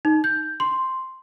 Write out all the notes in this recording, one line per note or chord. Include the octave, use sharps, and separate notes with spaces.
D#4
G6
C6